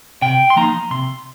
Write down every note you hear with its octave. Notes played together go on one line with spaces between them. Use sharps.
C3 G5
C6
F3 A#3 D#4 A#5
C3 C6